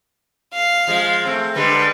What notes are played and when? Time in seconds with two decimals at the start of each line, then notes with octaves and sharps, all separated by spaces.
0.54 F5
0.87 F3 G#3
1.25 A3 C4
1.55 D3 G3 G#3 B4